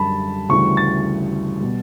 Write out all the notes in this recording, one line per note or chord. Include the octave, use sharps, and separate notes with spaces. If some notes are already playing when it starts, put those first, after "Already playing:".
Already playing: F#2 D3 G3 A5 B5
D2 C#3 E3 G3 C#6
A6
B2 G3